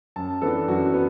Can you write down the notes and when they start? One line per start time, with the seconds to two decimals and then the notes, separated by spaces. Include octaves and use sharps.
0.16 F#2 A5
0.42 E3 B3 D4 A4
0.68 F#2 F#4
0.94 B3